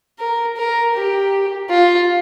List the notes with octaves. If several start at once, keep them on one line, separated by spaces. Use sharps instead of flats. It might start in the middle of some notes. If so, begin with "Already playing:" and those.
A#4
A#4
G4
F4